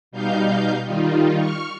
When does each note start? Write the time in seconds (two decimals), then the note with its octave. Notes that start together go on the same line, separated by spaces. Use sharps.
0.11 B2 G3 D#4 F5 G6
0.84 D#3 G3 D#4 F4
1.36 C#6 F6